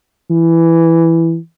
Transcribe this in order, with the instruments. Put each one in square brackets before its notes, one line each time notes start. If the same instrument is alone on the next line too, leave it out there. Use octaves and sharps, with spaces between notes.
[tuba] E3